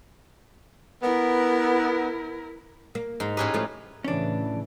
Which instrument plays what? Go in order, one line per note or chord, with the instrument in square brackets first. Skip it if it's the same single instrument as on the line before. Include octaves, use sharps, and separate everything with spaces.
[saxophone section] B3 [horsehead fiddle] E4 A#4
[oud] A#3
[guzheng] G#2 [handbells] G#4 D#5 A#5
[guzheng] A2 C#4 B4 [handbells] G4 A#5 D#6
[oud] F3 A3 F4
[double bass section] A2 C#3 E3 [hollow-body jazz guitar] C#4 D4